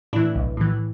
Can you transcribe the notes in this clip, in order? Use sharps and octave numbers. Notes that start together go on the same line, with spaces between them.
A2 E3 D4 E4
B1
A2 E3